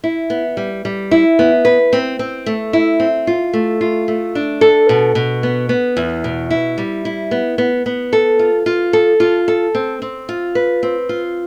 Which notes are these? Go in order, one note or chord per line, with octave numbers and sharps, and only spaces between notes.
E4
B3
G3
G3
E4
B3
B4
C4
C4
A3
E4
C4
F4
A3
F4
A3
D4
A4
B2
B2
B3
B3
E2
B2
E4
G3
E4
B3
B3
B3
A4
F4
F4
A4
F4
A4
C4
C4
F4
B4
C4
F4